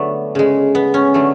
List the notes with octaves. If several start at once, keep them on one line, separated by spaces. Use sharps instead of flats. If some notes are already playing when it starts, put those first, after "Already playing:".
Already playing: D3 F#3 A3 B3 D4 B4
C#3 G#3
B3
C#4
D3 F#3 A3